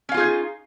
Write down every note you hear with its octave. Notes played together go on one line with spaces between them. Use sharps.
C#4 D#4 F4 G#4 F5